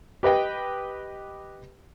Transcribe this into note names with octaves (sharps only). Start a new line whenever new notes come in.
G4 B4 D#5 G5